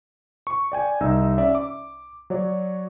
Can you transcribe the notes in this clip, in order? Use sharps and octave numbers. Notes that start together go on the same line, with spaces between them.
C#6
D5 G5 G#5
C2 D#4 D#5 E6
C#4 D5 E5
D6
F#3 C#5 D5